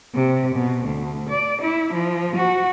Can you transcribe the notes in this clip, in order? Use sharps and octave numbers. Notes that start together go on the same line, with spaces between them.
C3
B2
D2
D5
E4
F3
F#4